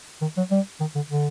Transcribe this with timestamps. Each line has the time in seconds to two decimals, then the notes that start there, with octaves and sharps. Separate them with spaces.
0.22 D#3
0.37 F#3
0.51 G3
0.80 D#3
0.95 D3
1.10 D3